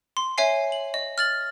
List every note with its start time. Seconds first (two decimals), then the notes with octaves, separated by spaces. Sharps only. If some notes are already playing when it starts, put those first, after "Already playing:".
0.17 C6
0.38 C#5 E5 G#5 C7
0.72 F#7
0.94 D#5
1.18 F6 A6 F#7